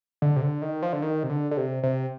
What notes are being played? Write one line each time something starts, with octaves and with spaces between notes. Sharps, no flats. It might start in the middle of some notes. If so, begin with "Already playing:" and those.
D3
C3
D3
D#3
F3
D3
D#3
C3
D3
D3
C3
C3